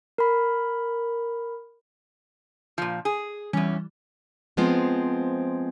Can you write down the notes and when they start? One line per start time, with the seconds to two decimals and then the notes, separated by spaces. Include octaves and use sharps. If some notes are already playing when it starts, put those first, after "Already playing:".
0.18 A#4 B5
2.78 A#2 F3
3.05 G#4
3.53 E2 E3 G3 C#4
4.57 F3 G#3 B3 C4 F4